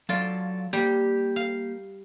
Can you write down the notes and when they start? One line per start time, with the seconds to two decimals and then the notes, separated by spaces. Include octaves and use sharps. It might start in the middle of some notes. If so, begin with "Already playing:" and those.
0.09 F#3 F4 A4 D5
0.73 G3 A#3 G4
1.36 F5